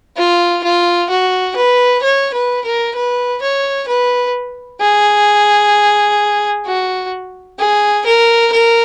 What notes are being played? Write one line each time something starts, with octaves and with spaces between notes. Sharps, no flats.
F4
F4
F#4
B4
C#5
B4
A#4
B4
C#5
B4
G#4
F#4
G#4
A#4
A#4